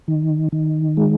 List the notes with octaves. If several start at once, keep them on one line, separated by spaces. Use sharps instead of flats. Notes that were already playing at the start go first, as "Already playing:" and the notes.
D#3
D#3
G#3